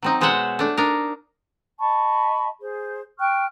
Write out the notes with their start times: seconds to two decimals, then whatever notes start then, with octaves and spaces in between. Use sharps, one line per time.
0.02 F#3 C4 D#4
0.21 B2 G#3 C5 C#5 E5 F#5
0.59 A3 D4
0.77 D4 D#4 A#4
1.80 D#5 A5 B5 C#6
2.61 G#4 C5
3.19 G5 C#6 F6 F#6